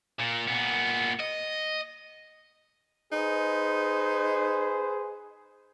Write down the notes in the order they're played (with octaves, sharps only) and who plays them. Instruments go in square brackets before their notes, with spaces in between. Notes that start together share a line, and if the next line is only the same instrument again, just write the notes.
[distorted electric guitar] A#2
A#2 B3
D#5
[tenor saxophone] D#4 [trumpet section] G#4 B4 C5